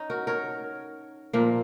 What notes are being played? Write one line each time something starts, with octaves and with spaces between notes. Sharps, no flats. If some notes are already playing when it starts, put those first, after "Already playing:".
Already playing: C#4 D#4
F#4 A#4
A#4 C#5
A#2 F3 A#3